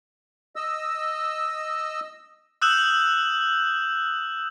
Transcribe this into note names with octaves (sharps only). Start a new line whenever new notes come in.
D#5 E6
D#6 E6 F#6 G6 E7 F#7